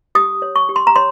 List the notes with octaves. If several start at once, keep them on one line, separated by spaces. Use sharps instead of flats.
G4 D#6
C#5
C#6
G4
C6
A#5
C#5 C6